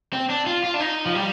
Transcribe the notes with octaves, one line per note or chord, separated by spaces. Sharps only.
C4
D4
F4
F4
D4
D#4
F3
G3